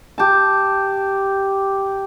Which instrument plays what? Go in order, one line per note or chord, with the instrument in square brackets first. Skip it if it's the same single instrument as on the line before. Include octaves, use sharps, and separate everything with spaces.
[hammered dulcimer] G4 A5